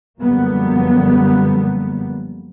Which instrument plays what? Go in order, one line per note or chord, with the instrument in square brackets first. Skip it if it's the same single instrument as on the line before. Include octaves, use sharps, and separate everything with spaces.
[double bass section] F#2 D3 F3 G3 A#3 B3